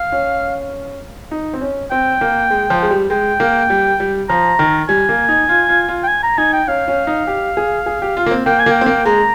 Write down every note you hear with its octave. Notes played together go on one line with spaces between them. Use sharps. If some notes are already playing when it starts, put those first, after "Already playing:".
Already playing: F5
C#4
D#4
C4
C#4
C4 G5
A#3
G#3
F3
G#3
G3
G#3 G5
A#3
G3
G3
F3 A#5
D#3
G3 G#5
A#3
D#4
F4
F4
F4
G5
G#5
A#5
D#4 G#5
G5
C#4 F5
C#4
D#4
G4
G#4
G#4
G4
F4
A#3
C4
A#3 G5
G#5
A#3
G5
C4
A#3
G#3 A#5